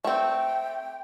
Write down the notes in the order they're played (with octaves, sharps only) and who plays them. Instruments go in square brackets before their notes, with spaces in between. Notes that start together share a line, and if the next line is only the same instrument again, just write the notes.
[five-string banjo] A3 C4 [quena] G5